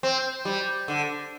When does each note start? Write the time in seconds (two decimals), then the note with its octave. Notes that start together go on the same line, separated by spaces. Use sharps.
0.03 C4
0.45 G3
0.88 D3